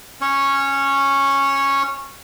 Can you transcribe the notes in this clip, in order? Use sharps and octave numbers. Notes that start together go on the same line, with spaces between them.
C#4 C#5